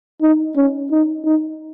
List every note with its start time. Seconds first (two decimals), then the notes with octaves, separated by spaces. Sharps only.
0.22 D#4
0.56 C#4
0.91 D#4
1.25 D#4